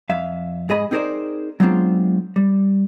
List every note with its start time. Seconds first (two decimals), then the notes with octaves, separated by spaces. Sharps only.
0.09 F2 E5 F5
0.69 G#2 G#4 D#5 B5
0.91 C4 D#4 G#4 A#4 C5 D5
1.60 F#3 G#3 B3 C4 D4 F4
2.36 G3